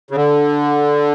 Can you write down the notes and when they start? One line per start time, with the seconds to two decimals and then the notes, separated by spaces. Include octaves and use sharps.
0.11 C#3
0.15 D3